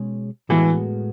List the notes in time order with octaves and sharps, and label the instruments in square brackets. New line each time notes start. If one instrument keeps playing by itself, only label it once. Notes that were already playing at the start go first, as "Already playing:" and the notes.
Already playing: [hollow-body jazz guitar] B2 G#3 C#4 G#4
[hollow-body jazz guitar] A2 G#3 B3 F#4 [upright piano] E3